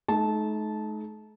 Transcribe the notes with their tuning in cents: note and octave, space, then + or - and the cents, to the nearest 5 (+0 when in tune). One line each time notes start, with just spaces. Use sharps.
A3 -45 D#4 +0 A5 -15